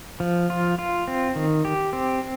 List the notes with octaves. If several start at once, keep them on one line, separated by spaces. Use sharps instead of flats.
F3
F4
F4
C4
D#3
G4
C4